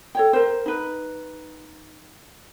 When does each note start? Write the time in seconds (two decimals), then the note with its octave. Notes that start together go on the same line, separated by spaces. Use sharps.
0.15 A4 C#5 G5
0.33 A#4 C5
0.66 D#4 B4